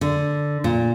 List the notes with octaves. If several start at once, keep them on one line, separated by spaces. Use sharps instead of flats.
D3
A#2